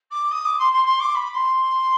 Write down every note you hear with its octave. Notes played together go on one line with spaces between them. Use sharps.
D6
D#6
D6
C6
C6
C6
D6
B5
C6